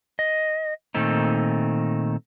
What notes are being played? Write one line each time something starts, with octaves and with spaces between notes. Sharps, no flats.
D#5
A#2 D#3 A3 C4 D#4